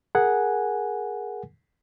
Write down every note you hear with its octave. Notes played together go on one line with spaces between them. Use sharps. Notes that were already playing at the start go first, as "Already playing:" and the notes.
G#4 A#4 F#5 G#5